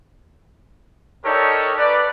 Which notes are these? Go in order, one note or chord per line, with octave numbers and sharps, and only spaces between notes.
D#4 G4 A4 A#4 C#5 D5
B4 D5